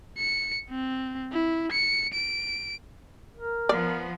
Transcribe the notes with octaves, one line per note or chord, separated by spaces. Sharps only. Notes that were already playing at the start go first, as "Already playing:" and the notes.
C#7
C4
E4
C#7
D7
A#4
F3 B3 D5